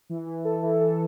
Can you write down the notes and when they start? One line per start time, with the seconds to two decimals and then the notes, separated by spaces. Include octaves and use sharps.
0.09 E3
0.26 E3
0.44 A4
0.63 E3
0.81 A4